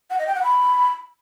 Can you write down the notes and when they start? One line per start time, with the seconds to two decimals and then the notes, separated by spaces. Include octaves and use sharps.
0.10 F#5
0.19 D#5
0.27 G5
0.35 F#5
0.43 B5